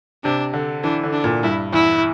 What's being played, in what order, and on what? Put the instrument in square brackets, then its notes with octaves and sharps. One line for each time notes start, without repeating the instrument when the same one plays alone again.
[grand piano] C3 [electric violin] D4
[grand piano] D3
[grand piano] E3 [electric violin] D4
[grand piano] D3
[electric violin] D4
[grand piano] A#2
[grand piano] G2 [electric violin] E4
[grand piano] E2 [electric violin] E4